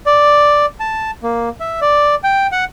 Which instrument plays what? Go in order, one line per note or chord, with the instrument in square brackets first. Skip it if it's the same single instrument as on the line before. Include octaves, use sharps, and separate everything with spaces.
[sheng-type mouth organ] D5
A5
A#3
E5
D5
G5
F#5